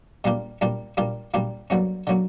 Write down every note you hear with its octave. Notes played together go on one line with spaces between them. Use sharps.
A#2 G3 A#3 D4 F4
A#2 G3 A#3 D4 F4
A#2 G3 A#3 D4 F4
A#2 G3 A#3 D4 F4
G2 D3 F#3 A#3 C#4
D3 F#3 A#3 C#4